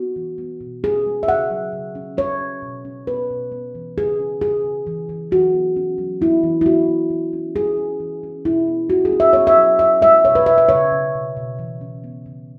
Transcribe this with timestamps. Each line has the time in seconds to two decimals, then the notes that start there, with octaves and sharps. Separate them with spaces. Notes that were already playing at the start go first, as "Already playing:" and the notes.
Already playing: B3 F#4
0.16 E3
0.38 B3
0.61 B2
0.83 C#4 G#4
1.06 G#3
1.23 E5
1.28 C#3 F#5
1.50 F#3
1.73 C#3
1.95 C#4
2.17 C#4 C#5
2.41 C#4
2.62 B2
2.85 C#4
3.07 B3 B4
3.30 B2
3.52 B3
3.75 E3
3.97 C#3 G#4
4.19 C#4
4.41 C#3 G#4
4.64 C#3
4.87 E3
5.09 E3
5.31 E3 F#4
5.54 B3
5.76 C#4
5.98 F#3
6.21 B3 E4
6.43 E3
6.61 E4
6.66 B3 F#4
6.88 B3
7.10 E3
7.33 C#4
7.56 G#3 G#4
7.77 C#4
8.00 E3
8.23 C#4
8.45 B2 E4
8.68 B3
8.90 C#4 F#4
9.05 G#4
9.12 C#4
9.20 E5
9.33 B3 C#5
9.47 E5
9.57 F#3
9.79 C#4 E5
10.01 G#3 E5
10.24 B2 C#5
10.35 B4
10.46 B2 E5
10.58 E5
10.69 C#3 C#5
10.92 C#3
11.15 B2
11.37 B2
11.59 E3
11.81 C#4
12.04 B3
12.26 C#3